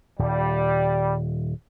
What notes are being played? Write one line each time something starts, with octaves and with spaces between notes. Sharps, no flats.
D#1 G3